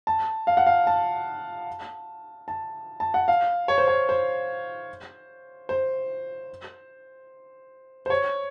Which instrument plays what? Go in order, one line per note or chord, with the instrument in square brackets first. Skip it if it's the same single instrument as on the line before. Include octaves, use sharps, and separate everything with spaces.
[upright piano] A5
F5
F#5
F5
A5
A5
A5
F#5
F5
C#5
C5
C#5
C5
C5
C5
C#5